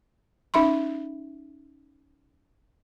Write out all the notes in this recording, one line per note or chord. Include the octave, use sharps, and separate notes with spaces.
C#4 D#4 E5 B5 C6